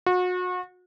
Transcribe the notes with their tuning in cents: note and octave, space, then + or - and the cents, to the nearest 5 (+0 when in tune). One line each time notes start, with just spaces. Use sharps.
F#4 -35